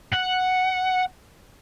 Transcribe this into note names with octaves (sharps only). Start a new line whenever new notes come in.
F#5